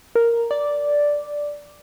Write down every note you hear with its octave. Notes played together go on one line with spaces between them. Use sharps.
A#4
D5